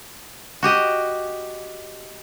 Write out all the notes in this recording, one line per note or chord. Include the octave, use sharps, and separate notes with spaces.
F#4 G4 D#5